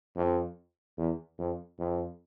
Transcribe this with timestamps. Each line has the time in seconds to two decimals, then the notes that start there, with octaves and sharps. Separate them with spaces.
0.16 F2
0.97 E2
1.38 F2
1.79 F2